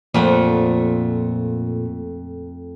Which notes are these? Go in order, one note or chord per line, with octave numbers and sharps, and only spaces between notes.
F2 A#2 A3 F#5